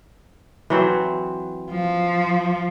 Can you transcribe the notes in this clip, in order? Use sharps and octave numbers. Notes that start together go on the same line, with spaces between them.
E3 F#3 C4
F3